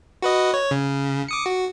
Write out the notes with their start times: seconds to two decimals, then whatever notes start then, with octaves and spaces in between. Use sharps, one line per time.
0.22 F#4 B4 D#5
0.54 C#5
0.71 C#3
1.28 D6 D#6 C#7
1.46 F#4